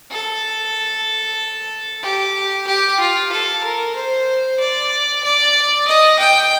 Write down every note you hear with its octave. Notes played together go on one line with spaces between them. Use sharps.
A4
G4
G4
F4
A4
A#4
C5
D5
D5
D#5
G5